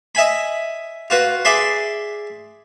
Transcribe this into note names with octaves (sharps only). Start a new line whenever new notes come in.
D#5 E5 G#5 B5
F4 F#4 B4
G#4 D5 E5 B5 C6